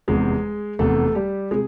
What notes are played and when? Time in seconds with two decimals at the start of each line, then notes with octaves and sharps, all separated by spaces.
0.08 F1 E2 C3 G#3 G#4
0.79 F1 E2 C3 A3 A4
1.15 G3 G4
1.51 C3 G#3 G#4